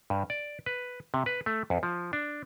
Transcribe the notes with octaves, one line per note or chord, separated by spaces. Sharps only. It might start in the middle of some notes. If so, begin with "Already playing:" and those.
G2
D5
B4
C3
B4
A3
F2
F3
D4